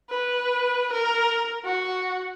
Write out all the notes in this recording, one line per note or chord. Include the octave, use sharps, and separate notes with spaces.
B4
A#4
F#4